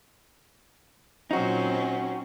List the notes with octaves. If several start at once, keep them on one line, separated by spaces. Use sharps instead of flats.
A#2 F#3 C4 C#4 D#4 F#4